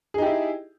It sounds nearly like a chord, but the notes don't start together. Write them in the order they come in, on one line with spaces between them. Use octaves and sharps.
G#4 D#4 G4 E4